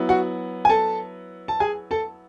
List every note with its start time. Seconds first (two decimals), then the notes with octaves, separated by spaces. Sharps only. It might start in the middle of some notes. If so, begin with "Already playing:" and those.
Already playing: F#3 B3 E4
0.09 F#4 F#5
0.65 G#5
0.69 A4 A5
1.48 A5
1.60 G#4 G#5
1.91 A4 A5